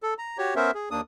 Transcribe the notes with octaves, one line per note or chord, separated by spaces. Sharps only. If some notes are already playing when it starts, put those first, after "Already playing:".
A4
A#5
F#4 G4 C#5
B3 C#4 A#4 C5 E5
G#4
D#2 A#3 D4 D#6